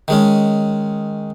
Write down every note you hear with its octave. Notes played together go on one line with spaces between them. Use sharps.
D#3 G#3 C#4